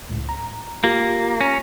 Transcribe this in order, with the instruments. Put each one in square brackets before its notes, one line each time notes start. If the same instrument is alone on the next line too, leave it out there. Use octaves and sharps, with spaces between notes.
[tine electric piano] C#2 A2
A#5
[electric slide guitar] A#3 [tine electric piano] F4 G4
[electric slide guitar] C#4 [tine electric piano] A#6